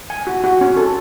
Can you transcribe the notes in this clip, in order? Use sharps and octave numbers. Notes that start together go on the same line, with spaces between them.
G#5
F#4
F#4
C#4
A4